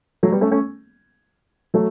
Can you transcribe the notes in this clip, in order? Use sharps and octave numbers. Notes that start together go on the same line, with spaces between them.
F#3 A3
G3 B3
A3 C#4
A3 C#4
F#3 A3